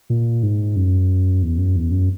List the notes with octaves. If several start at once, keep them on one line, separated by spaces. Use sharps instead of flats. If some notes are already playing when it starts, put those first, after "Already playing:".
A#2
G#2
F#2
E2
F#2
E2
F#2